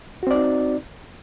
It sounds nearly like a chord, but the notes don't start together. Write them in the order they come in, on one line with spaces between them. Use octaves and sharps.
F#4 C4 D5 D#4